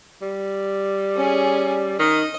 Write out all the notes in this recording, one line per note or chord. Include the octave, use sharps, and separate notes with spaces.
G3
C#4 G#4
D#3 D#5